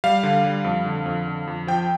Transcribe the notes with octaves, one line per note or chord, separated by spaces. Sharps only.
G3 F5
D3
G3
F2
D3
F2
D3
F2
F3 G5